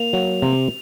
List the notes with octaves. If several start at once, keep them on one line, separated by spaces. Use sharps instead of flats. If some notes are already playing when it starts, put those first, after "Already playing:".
Already playing: A#3 F7
F#3
C3